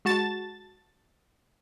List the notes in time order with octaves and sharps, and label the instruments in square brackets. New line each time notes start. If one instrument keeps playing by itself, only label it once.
[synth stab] G#3 F#4 A5 A6